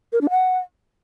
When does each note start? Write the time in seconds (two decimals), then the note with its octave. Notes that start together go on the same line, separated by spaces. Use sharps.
0.13 A#4
0.21 D4
0.30 F#5